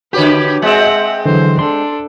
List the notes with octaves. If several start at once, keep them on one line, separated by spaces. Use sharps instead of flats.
D3 F#4 G4 B4 C#5
G#3 C4 E5 F#5
D3 E3 F#3 C5
D4 A4 C6